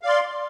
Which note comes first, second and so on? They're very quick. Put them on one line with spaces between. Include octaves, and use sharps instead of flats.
F5 D5 C6